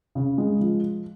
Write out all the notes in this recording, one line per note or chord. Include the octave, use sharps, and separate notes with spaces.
C#3
G#3
F3